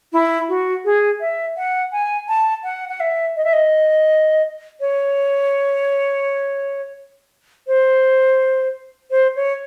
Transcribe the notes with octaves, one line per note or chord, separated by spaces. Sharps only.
E4
F#4
G#4
E5
F#5
G#5
A5
F#5
F#5
E5
D#5
E5
D#5
C#5
C5
C5
C#5